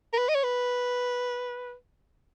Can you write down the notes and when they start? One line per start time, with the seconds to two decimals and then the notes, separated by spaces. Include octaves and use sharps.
0.13 A#4
0.18 B4
0.29 D#5
0.35 C#5
0.44 B4